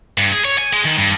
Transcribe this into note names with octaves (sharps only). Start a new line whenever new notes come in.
G2
G#4
C#5
G#5
G#3
D#3
G2